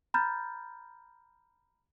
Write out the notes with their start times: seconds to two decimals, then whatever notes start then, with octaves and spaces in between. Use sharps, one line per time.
0.14 A#5 B5 F6 G6 A6